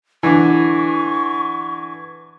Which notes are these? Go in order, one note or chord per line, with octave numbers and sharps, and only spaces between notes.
D3 E3 C#6